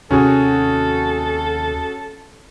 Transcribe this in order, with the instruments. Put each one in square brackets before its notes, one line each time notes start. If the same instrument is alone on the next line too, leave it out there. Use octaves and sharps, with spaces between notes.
[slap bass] D#2 C3 D4 [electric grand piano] C#4 F#4 G#4 [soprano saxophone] A4